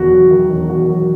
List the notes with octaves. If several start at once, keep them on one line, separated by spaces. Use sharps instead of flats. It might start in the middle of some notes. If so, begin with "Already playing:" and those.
Already playing: E1 E2 D#3 F#4
F#3
D#3
E1
E2 F#4
F#3